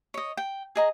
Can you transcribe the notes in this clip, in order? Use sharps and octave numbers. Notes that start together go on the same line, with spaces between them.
C#5 D#5
G5
G#4 D#5 A#5